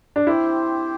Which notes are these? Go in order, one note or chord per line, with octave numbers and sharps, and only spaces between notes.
D4
C4 E4 G4 C5